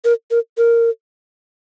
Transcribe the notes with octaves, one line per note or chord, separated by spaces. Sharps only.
A#4
A#4
A#4